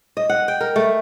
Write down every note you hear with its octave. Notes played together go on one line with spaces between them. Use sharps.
D#5
F#5
G5
A#4
A3